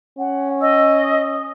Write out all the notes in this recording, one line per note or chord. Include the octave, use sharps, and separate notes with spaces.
C#4 F#5
D#5 E6
D#6